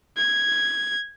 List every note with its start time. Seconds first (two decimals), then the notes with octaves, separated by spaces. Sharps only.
0.17 G#6